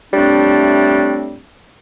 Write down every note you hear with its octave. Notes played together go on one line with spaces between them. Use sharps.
A2 G3 A3 C4 D4